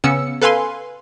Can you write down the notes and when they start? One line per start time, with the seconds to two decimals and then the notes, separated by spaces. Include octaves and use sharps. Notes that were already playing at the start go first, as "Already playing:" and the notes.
0.04 C#3 B3 C#4 E6 C#7
0.42 A4 B4 F5 G#5 C6